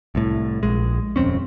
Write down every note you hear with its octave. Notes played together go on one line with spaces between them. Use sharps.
C2 A2
A#1 G#3
D#1 F2 C4 C#4